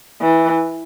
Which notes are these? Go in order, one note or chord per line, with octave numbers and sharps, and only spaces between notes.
E3